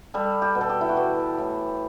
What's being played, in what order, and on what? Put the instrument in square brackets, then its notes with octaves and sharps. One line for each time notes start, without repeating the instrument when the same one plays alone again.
[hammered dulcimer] G3 A4
G4
B2
A4
G4
E4
F#4
E3 G4
A2